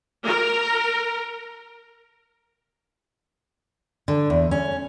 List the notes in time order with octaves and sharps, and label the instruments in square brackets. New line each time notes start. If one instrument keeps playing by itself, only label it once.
[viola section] A#4
[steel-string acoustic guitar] D3
E2
C#4